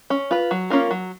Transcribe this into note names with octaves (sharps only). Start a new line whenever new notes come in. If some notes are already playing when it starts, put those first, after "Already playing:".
C#4
F4 B4
F#3
A#3 C#4 F4 A#4
F#3